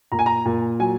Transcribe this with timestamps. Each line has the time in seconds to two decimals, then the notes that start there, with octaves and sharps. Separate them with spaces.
0.12 A#2 A#5
0.19 G#5
0.26 A#5
0.45 A#2
0.79 F#3 G#5